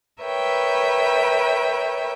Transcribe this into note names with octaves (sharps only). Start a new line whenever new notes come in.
A#4 B4 C#5 E5 G5